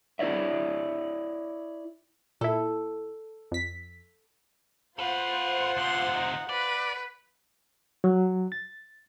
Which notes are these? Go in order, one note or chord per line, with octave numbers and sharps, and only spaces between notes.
E4 C#5 D5 E5
A#2 E4 A4
F2 B6
F4 A4 B4 C5 F#5
D2 C3 C6
D#4
B4 D5
F#3
A6